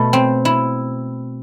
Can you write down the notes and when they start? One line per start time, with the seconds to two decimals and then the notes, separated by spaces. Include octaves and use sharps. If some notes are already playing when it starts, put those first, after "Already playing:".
Already playing: B2 A3
0.13 C4
0.45 E4